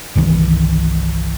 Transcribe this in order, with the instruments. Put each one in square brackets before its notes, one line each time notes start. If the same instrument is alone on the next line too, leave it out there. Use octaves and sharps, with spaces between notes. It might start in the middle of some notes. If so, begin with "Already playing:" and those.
[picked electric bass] G1 C2 D#3 E3